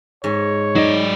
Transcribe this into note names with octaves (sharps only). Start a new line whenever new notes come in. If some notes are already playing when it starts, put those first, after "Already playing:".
G#2 C#5
F#3 D#4 D5